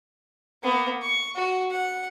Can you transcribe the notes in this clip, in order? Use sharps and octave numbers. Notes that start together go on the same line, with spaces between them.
A#3 B3
C#6
F#4
F#5